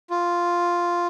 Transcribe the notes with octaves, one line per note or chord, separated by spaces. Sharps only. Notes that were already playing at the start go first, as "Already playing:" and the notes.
F4